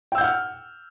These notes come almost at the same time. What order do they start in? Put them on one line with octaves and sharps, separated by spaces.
G5 E6 G6 F#5 F6